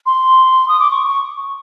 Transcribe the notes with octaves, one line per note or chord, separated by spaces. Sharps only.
C6
D#6
D6
C#6
C#6